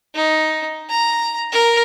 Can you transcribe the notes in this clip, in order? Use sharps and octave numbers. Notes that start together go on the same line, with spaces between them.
D#4
A#5
A#4